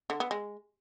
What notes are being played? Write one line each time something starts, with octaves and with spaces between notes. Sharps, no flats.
D3
B3
G#3